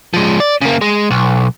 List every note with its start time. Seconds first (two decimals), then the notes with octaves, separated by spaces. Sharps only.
0.14 F3 G#3
0.40 D5
0.62 C#3 A#3
0.81 G#3
1.11 B1